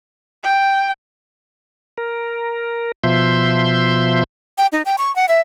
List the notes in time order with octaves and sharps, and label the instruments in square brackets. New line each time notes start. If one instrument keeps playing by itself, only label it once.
[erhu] G5
[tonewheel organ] A#4
B2 F3 E5 C6 G6
[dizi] G5
D#4
G5
C#6
F#5
E5